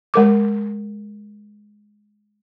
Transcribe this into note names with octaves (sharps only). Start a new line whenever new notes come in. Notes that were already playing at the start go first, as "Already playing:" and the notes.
G#3 A#4 D6